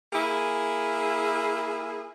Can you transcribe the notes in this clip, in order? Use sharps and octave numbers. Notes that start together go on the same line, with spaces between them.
A#3 E4 G#4